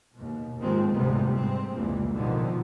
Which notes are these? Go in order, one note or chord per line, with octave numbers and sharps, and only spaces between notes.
D#2 B2
D#2 G#2 D#3 F3 G#3 C4
F1 D2 G#2 C3 G3 B3
G#2 C3 C4
F1 C#2 E3 G3 A#3
A1 G#2 B2 D3 D#3 F3